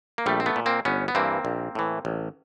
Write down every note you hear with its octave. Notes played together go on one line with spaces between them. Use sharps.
A#3
A#1 G3 A3
C4
A3 B3
A#2
A#3 C4
G1 B3 C#4
B3
G2 E3 A#3 C4
A#1
A2 E3
A1